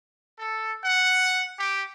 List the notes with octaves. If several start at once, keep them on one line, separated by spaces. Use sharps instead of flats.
A4
F#5
G4